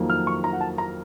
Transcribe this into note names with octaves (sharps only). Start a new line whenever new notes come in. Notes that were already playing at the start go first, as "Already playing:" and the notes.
Already playing: F2 D#3 F#3 A#3
F6
C#6
A#5
F#5
A5
A#5